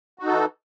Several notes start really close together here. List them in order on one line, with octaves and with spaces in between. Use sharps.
F#4 D#4 A4 E3